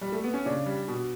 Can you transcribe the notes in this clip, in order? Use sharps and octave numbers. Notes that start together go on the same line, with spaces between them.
G3
A3
B3
C#4
C#3 D4
G3
B2